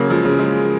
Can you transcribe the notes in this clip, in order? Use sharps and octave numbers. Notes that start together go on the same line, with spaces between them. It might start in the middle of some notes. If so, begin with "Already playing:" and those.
Already playing: C#3 F#3 A#3
F3 G#3
C#3
F3 G#3